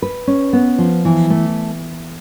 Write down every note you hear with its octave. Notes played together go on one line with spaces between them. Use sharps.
B4
C#4
B3
F3
E3
A3